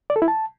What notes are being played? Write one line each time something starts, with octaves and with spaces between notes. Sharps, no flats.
D5
A4
E4
A5